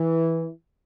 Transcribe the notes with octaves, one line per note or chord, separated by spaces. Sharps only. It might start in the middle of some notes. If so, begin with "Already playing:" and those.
Already playing: E3